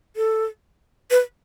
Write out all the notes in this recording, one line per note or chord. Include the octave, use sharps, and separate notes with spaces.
A4
B4